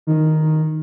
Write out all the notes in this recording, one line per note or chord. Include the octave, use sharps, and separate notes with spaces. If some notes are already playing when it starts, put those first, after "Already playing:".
D#3